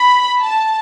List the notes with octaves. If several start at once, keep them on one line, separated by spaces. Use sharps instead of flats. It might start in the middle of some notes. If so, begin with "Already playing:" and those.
Already playing: B5
A5